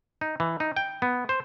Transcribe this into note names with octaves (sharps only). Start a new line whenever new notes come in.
D#4
E3
D#4
G5
B3
C5